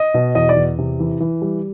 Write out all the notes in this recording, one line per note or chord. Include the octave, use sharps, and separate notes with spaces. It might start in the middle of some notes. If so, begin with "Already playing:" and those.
Already playing: D#5
B2
E2 D#5
D5
E2
C3
E3
E3
G3